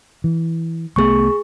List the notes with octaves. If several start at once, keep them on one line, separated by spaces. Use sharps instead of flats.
E3
C2 A3 B3 G#4 C#6